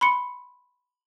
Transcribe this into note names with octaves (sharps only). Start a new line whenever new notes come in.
B5 C6 C#7